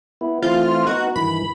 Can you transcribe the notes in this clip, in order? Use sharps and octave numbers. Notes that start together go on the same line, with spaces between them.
B3 E4
E3 A3 C4 F4
B3 D#4 F#4
G2 D#3 E3 B5